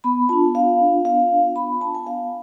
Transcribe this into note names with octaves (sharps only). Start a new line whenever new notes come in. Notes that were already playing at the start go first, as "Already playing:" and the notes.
B3 B5
D4 F4 A5
B3 F5
D4 F4
B3 F5
D4 F4
B3 B5
D4 F4 A5
G#5
B3 F5